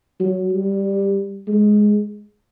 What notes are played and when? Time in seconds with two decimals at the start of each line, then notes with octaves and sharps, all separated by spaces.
0.20 F#3
0.53 G3
1.48 G#3